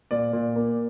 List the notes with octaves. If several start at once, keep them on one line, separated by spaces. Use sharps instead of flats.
A#2 D5
A#2
A#3